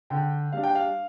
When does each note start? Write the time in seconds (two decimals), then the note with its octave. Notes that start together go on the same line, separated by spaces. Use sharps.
0.10 D3 G5
0.52 G3 D4 F5
0.63 G5
0.75 F5